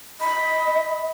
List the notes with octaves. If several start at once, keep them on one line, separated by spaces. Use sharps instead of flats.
D#5 B5